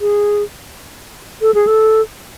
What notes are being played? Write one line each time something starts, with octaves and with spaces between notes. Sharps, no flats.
G#4
A4
G#4
A4